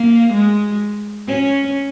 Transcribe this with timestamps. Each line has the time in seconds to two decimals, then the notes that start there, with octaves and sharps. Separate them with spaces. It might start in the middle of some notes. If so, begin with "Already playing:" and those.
Already playing: A#3
0.33 G#3
1.27 C#4